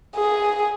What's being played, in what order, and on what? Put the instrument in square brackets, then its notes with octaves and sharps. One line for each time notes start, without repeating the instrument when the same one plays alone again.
[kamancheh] G#4